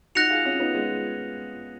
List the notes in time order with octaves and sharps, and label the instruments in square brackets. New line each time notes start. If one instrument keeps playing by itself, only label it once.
[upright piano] D#4 F#4 [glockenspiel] F#6 A#6 C#7 F7
[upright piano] F4 G#4
C#4 F4
B3 D#4
G#3 B3